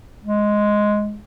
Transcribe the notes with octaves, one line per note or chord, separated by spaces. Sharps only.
G#3